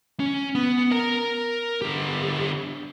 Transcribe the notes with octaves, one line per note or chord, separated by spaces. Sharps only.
C#4
B3
A#4 A#5
D3 G4